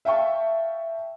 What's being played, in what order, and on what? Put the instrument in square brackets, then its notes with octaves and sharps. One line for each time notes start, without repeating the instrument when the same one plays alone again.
[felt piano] E5 F5 G5 A5 C#6